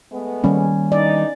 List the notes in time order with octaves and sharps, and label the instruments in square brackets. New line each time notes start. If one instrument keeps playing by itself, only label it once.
[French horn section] G#3 A3 B3
[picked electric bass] D#3 G3 A#3 [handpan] C#4
[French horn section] E2 D4 D#4 [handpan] D5